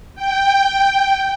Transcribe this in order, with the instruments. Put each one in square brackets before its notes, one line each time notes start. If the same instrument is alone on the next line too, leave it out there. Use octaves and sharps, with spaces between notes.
[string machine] G5